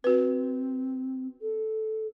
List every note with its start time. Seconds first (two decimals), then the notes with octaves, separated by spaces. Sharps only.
0.04 C4 F#4 B4
1.41 A4